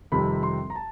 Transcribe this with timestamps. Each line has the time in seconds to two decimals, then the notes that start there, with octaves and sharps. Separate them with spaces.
0.12 F2 C3 D#3 G3 C4 B5
0.43 C6
0.70 A#5
0.75 A5